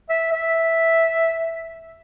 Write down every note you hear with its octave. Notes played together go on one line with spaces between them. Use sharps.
E5
E5